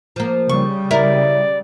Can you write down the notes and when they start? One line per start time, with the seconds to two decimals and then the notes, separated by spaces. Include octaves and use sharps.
0.16 F3 A#3
0.49 C#3 G3 C#6
0.91 E4 A#4 D5